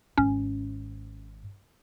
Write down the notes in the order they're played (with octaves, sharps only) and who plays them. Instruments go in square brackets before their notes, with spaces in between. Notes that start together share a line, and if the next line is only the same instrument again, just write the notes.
[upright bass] G#1 G#2 [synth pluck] C#4